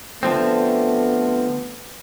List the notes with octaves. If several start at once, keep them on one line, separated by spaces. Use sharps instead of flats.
D3 F3 A3 B3 C4